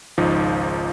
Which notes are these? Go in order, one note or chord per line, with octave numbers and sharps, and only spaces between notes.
G#1 C#2 F3 D#4